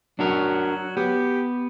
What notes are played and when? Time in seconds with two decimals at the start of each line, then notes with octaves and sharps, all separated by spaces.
0.19 F#3 D4 F#4 A#4
0.97 B3 G4